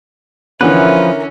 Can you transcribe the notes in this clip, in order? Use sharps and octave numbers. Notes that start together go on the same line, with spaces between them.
D3 E3 F3 C#4 A#4 B4 E5